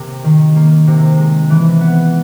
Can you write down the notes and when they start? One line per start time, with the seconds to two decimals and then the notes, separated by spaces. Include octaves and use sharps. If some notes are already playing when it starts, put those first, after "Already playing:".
Already playing: C3 A#3
0.24 D#3
0.56 A#3
0.87 C3
1.18 G#3
1.50 E3
1.81 B3